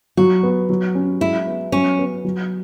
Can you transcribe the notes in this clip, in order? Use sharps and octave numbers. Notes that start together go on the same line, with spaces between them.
F#3 F#4
B3
F#3
C#4
G#3 E4
B3
F#3 C#4
B3
F#3